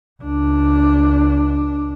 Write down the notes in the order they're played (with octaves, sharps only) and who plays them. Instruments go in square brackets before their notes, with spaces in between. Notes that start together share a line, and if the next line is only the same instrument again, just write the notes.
[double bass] C#2 D4